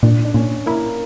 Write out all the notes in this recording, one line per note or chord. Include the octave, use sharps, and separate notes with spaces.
A#2 D4
D4
A#2 C#4
A#3 E4